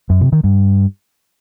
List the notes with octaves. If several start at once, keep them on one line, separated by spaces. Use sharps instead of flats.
F#2
C3
D#3
G2